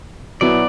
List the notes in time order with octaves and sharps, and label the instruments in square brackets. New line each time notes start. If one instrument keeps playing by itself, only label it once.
[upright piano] B2 F#3 B3 E4 [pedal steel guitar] D5